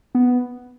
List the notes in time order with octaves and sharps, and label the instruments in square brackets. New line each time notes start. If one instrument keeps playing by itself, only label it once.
[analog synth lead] B3